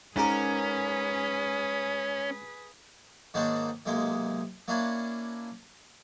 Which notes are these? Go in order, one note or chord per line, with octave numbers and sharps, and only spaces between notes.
G#2 C#4 G#4 A#4 B4 D6
G#2 D#3 A#3 D4 C5 C#5
B1 C3 G#3 A#3 C6
A#3 C#4 D4 E4